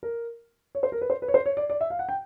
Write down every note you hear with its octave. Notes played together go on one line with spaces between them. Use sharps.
A#4
C#5
C5
A#4
B4
C5
B4
C#5
C5
C#5
D5
D5
E5
F5
F#5
G5